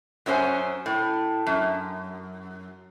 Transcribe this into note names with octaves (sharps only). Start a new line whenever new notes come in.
F#2 F#3 C#4 C5 F#5 G#5
A2
F#2